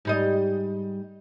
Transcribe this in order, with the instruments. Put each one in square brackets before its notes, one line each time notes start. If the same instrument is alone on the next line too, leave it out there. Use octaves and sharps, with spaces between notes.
[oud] G#2 G3 D#5